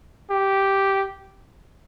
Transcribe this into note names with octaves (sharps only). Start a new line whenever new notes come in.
G4